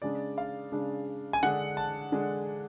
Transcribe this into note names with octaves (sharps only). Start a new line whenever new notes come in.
C#3 G#3 D4 D5
F5
C#3 G#3 D4
G#5
D3 G#3 D4 F#5
A5
D3 G#3 D4